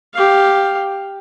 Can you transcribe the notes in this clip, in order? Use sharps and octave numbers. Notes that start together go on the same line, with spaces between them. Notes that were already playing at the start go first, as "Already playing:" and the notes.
G4 F5